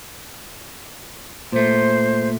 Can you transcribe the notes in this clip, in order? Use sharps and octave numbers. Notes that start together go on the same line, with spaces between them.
A#2 A3 C5